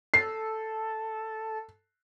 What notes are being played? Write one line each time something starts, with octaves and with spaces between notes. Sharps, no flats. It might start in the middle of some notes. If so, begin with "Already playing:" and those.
A4 C7